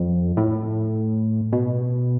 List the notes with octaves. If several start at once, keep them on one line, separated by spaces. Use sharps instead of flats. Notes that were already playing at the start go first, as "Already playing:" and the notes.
Already playing: F2
A2
B2